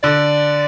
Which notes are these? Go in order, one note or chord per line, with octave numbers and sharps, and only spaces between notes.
D3 D5